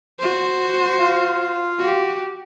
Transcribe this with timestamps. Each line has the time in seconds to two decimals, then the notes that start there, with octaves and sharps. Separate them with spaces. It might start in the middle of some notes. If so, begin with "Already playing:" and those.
0.19 F#4 C5
0.99 F4 F5
1.79 F#4 G4